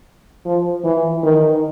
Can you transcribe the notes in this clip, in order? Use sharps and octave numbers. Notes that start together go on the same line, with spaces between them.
F3
E3
D#3